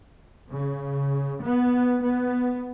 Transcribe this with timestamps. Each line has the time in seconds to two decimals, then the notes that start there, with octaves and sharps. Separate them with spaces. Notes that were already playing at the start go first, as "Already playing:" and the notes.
0.49 C#3
1.42 B3
2.02 B3